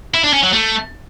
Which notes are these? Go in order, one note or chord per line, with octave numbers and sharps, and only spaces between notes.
E4
D4
C#4
F#3
A3